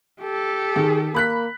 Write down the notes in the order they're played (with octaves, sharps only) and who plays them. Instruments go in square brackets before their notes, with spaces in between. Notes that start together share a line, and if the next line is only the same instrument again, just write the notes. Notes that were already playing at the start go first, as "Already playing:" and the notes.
[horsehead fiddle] G4 A4
[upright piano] D#3 [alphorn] G#4
[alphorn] A#3 [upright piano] B5 F#6 B6